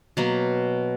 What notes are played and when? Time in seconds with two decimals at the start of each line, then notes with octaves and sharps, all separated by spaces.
0.17 B2 F#3 A#3